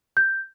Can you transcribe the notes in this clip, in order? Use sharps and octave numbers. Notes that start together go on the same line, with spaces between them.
G6